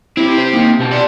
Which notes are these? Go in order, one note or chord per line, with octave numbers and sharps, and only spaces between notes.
C4 E4 G4
C5
A#3 D#4
B2 G4 A5
D5 C6